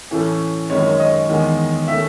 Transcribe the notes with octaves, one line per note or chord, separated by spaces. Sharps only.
A2 E3 A3 C#4
F#2 D#3 G#3 C#4 C#5
D#5
E2 D#3 G#3
D#3 A3 C#4 E5